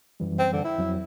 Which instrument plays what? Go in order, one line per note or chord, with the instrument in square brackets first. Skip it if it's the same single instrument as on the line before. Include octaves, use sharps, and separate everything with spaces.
[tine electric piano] F#2 E3 G3
[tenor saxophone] C4
D3
E4
[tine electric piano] F2 F#3